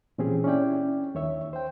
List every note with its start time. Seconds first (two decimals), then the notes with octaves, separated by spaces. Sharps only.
0.18 A#2 E3 C4 C#4 G4 G#4
0.44 C#4 D4 E4 D5 G5
1.15 D#2 D#3 C#5 E5
1.53 C5 G5